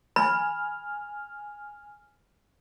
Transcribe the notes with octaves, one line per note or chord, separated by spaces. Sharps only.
G#5 B5 F6